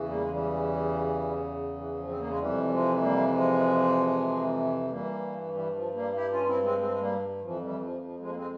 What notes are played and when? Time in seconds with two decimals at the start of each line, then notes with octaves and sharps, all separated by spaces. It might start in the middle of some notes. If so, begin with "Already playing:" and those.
Already playing: E2 C#3 E3
0.09 G3 A#3
0.20 G#3
0.30 E3 G3
1.76 E3
1.98 F3
2.08 C4
2.18 A#3
2.29 G#3
2.39 F2 C3 E3 G3
2.63 G3
2.70 F3 G#3
3.01 G3 A#3
3.33 F3 G#3
4.90 G2 E3 G3 A#3
5.53 E3 G3
5.74 F3
5.94 G3 A#3
6.15 E4 G4
6.31 C#4 F4
6.42 F4
6.47 C4 E4
6.63 G#3 C4
6.78 G#3 C4
6.89 G#3
6.99 G3 A#3
7.42 F2 E3 F3
7.62 E3 G3
7.83 F3
8.04 F3
8.19 F3 G#3
8.29 A#3
8.35 G#3 C4